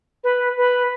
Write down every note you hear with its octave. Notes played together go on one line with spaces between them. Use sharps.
B4
B4